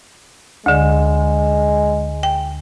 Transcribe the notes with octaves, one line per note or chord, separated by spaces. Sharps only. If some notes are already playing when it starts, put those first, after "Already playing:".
D2 D3 G#3
G5